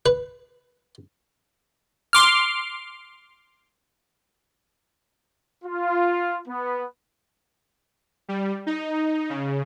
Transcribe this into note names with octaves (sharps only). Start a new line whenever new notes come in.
B4
C6 D6 F6
F4
B3
G3
D#4
C#3